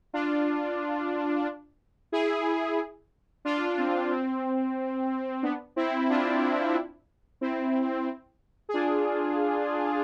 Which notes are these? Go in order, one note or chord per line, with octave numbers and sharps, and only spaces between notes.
D4 F4
E4 G#4
D4 F4
C4
C4
B3 D4
C4 E4
D4 F4
C4 E4
G#4
D4 F4